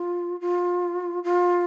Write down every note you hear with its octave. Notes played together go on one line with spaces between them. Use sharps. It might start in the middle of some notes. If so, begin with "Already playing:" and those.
Already playing: F4
F4
F4